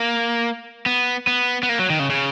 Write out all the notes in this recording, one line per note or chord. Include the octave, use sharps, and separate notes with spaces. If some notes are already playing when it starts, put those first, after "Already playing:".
Already playing: A#3
B3
B3
B3
A#3
F#3
D#3
C#3
C#3